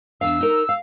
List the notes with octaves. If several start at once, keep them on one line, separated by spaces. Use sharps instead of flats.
E2 D4 F5 E6
D#4 A#4
F5